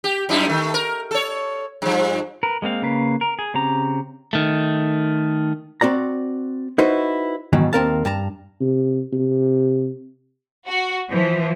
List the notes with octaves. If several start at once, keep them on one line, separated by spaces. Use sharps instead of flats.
G4
F#2 D#4 E4
D#3 A3
A#4
A4 C#5
G2 F3
A#4 B4
G#3 A#3 C4 F5
C#3 A#3 B4 F5
A#4
G#4
C#3 C4 G4 A#5
D#3 A3
C4 F#4 D5 A#5
D#4 E4 F#4 B4 C5 E5
G#2 B2 D#3 E3 F#3
D#2 F#3 C4 A#4 F5 A5
G2 A5 A#5
C3
C3
F#4
E3 F3